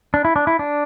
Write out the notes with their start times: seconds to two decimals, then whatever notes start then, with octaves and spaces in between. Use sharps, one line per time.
0.14 D4
0.25 E4
0.36 D4
0.47 E4
0.59 D4